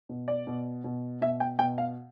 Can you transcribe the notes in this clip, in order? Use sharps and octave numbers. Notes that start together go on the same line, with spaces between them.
B2
D5
B2
B2
B2 E5
G5
B2 G5
F5